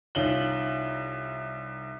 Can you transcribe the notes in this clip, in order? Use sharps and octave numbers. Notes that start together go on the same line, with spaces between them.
C2 C#4 D#4 F4 F#7 G7